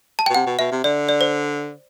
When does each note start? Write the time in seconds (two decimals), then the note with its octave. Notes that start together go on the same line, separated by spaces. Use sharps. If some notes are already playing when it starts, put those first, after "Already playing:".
0.19 A5
0.26 G5
0.30 B2
0.34 C3 F#5
0.46 B2
0.59 B2 E5
0.72 C3
0.84 D3 D5
1.09 D5
1.21 C5